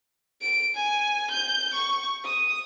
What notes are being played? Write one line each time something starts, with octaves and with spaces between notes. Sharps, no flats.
D7
G#5
G6
C#6
D#6